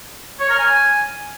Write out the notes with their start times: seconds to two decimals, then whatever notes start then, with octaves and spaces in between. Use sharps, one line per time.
0.40 C#5
0.50 A#4
0.59 G#5